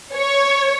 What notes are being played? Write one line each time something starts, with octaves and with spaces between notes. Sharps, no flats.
C#5